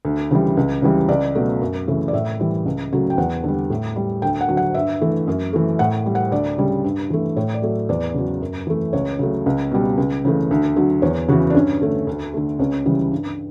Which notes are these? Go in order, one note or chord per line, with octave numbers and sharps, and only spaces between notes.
D2
C#3 E3 G3
C#2
C#3 E3 G3
C#2 D5
B2 F#3 A3
F#2
C#3 E3 A3
D5
A2 E5
E3 G3
C#2
C#3 F#3 A3
G5
E2 F#5
D3 G3
A2
G3
D2 G5
F#5
D3 F#3
F#5
G2 E5
E3 A3
F#2
E3 A3
A2 F#5
G3
F#5
D2 D5
C#3 G3
G2
E3 A3
A2 C#5
D5
F#3 A3
E2 D5
C#3 F#3
F#2
E3 A3
C#2 C#5
C#3 F#3 A3
C#2
B2 G3
C#2
C#3 E3 A3
D2
D3 F#3
E2 C#5
C#3 E3 F#4
D4
G2 C#4
D3 A3
D2
D3 A3
C#2 C#4
C#3 E3 G3
G2